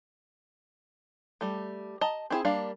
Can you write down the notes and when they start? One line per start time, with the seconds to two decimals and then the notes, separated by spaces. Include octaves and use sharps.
1.41 G3 A3
2.01 D#5 A5 A#5
2.30 C4 E4 G#4
2.45 G3 A#3 D4 F5